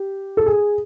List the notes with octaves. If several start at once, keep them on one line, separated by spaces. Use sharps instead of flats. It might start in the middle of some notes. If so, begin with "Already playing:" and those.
Already playing: G4
A4
G#4